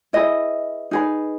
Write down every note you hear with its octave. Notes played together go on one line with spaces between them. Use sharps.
E4 G#4 B4 D#5
D#4 G#4 B4